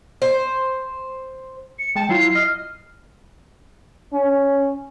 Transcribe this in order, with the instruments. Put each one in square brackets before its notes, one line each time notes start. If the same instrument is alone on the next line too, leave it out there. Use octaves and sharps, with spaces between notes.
[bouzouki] C5
[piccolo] C#7
[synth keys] G#3 A5 [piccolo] G5
[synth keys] F#3 E4 F4 [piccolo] C7
[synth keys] D#5 [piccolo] F6
[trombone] C#4